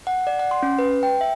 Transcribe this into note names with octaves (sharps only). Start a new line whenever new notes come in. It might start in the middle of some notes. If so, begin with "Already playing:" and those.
F#5
D5
F#5
C6
C#4
B4
G5
E5